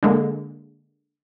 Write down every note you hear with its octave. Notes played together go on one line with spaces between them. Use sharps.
D3 G#3 A#3